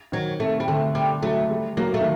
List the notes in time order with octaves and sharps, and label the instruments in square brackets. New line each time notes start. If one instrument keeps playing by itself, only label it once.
[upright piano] D#3 [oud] F#3
[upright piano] C3 [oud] A3
[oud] G3
[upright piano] D3 [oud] A3
[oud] G3
[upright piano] F#3 [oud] A3
[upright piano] G3
[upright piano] F#3 [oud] A#3
[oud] A3
[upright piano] D#3